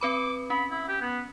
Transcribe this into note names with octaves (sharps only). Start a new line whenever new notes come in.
C4 B4 B5 D6
C#4 B5
E4
G4
B3